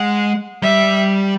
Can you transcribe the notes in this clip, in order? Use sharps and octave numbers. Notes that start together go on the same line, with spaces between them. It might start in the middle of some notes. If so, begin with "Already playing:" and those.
Already playing: G#3 F#5
G3 E5